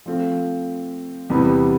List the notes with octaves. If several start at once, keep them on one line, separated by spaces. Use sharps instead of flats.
F3 A3 C4 F4
E2 C3 G3 B3